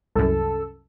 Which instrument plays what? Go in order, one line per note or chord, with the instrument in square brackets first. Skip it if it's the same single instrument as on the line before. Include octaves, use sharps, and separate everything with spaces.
[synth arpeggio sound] C2 F#2 [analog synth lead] A4